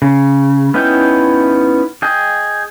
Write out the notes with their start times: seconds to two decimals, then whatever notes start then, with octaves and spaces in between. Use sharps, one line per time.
0.02 C#3
0.74 B3 C#4 D#4 E4 G5
2.02 G#4 D#5 G5